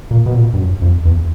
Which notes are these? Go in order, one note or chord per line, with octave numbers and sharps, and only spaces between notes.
A#2
B2
A#2
G2
F#2
F2
E2